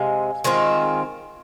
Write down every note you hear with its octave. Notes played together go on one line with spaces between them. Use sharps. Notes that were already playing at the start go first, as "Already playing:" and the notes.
Already playing: C3 G#3 F5 G#5
D#3 G#3 C4 F4